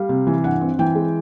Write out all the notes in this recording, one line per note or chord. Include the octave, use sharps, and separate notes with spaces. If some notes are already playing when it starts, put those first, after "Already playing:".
Already playing: G3 F5
C3
E3
G2 F#5
C4
E3 G5
G#3